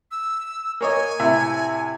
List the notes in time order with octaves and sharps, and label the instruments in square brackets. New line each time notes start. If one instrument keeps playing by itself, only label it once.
[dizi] E6
[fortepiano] A#3 C#5 D#5 [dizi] G#5
[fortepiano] A2 C3 E5